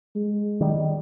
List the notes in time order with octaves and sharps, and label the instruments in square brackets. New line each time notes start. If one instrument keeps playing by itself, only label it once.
[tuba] G#3
[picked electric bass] D#3 G3